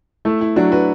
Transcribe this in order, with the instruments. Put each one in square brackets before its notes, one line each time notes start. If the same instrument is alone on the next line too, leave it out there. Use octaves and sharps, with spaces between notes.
[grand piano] A3 [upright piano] E4
[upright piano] E4
[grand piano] F#3 [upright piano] D4 F#4
[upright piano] F#4 B4